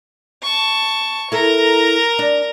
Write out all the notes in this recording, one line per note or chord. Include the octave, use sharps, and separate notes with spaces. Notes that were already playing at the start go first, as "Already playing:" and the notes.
A5 C#6
E4 A4 A#4 A#5
D4